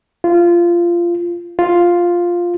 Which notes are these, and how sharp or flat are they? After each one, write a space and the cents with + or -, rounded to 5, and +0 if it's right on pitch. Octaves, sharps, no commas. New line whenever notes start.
F4 -15
F4 +5